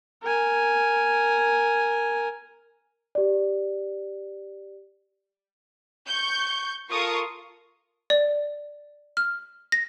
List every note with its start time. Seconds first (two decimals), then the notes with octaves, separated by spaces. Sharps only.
0.23 A#4 G#5
3.15 G4 D5
6.07 C#6 G6
6.91 F4 A4 A#4 F5 C#6 D#6
8.10 D5
9.17 F6
9.72 A#6